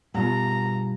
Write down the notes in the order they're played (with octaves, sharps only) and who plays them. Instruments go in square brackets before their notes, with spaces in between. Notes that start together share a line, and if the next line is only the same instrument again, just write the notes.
[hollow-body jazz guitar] G2 B2 F4 [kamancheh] A#5